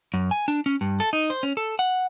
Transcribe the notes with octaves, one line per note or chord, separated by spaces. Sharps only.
F#2
G#5
D4
C#4
G2
A4
D#4
C5
C#4
A4
F#5